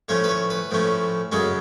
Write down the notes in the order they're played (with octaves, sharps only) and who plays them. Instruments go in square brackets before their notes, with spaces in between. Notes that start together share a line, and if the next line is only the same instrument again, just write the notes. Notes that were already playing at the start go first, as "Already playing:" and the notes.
[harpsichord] A2 F3 A3 C#4 C#5
B4
C#5
B4
A2 F3 A3 C#4
F#2 C#3 G#3 C#4 A4